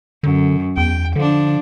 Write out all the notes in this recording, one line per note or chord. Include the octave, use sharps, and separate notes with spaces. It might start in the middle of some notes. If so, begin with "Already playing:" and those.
F#2 D3
E2 G5
D3 F3 D4